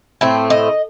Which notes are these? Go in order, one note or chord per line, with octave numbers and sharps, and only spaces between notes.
A2 A3 C4
D#5